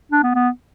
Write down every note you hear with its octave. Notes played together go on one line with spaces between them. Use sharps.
D4
B3
B3